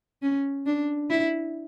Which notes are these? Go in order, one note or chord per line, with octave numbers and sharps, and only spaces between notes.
C#4
D4
E4